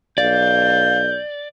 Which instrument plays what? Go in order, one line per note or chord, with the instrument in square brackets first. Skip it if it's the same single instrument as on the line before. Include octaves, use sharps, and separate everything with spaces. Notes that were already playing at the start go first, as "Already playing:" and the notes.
[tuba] B1 [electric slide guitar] D5 [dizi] F5 [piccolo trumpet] G6